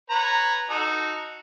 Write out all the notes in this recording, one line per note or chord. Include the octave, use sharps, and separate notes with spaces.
B4 C#5 A#5
D#4 F#4 A4